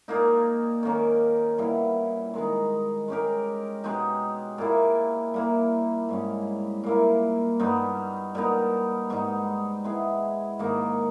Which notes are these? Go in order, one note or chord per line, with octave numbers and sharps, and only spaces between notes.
A#2 A#3 D#4
D#3 A#3 C#4
A#2 G3 B3 E4
D#3 G#3 D#4
G#3 C#4 G4 A#4
B2 G#3 D#4 G4
A#2 A#3 E4
G3 A#3 E4
G#2 G3 C#4
A#2 A#3 E4
G2 G3 B3 D#4
A#2 G3 B3 D#4
G#2 G3 B3 D#4
G#3 B3 E4 G#4
G#2 D#3 A#3 D#4